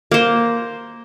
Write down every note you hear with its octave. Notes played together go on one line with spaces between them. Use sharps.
A#3 C5